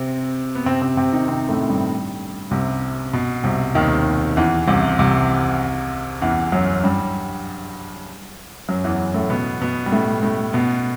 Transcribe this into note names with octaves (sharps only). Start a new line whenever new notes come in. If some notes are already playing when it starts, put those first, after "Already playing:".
Already playing: C3 C4
B3
C3 C4
C3 C4
C3 C4
D#3 D#4
C3 C4
A2 A3
G2 G3
C2 C3
B2
C2 C3
D#2 D#3
E2 E3
C2 C3
C2 C3
E2 E3
F#2 F#3
G2 G3
F#2 F#3
E2 E3
A2 A3
B2 B3
B2 B3
G3
A2 A3
A2 A3
B2 B3